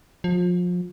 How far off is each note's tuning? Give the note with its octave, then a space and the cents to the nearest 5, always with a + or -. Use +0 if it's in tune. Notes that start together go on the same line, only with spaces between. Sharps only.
F3 +30